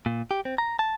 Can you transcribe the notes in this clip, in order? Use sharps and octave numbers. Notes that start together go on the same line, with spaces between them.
A#2
G4
C4
A#5
A5